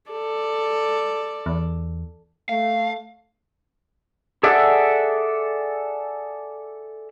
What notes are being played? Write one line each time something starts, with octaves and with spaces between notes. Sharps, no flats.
A4 D5
E2
A3 F5
G#4 A4 D5 E5 F#5